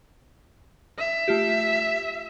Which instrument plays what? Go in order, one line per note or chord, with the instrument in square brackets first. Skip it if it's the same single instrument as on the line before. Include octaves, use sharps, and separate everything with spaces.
[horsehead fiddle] E5
[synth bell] A3 F4 G4